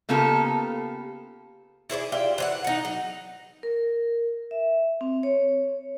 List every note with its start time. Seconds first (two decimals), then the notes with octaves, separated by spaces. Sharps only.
0.09 C#3 A#3 B3 F4 G4 A4
1.90 E4 G#4 C5 D5
2.12 F4 G4 D5 E5
2.38 E3 C5 F#5
2.64 D#4 F#5
2.85 F#3
3.63 A#4
4.51 E5
5.01 C4
5.23 C#5